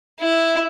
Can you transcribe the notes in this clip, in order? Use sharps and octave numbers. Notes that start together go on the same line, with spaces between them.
E4